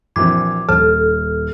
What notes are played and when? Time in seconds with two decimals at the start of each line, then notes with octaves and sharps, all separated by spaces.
0.16 A#1 E3 C4 F#4 D6 G#6
0.69 D#1 A4 A5 F6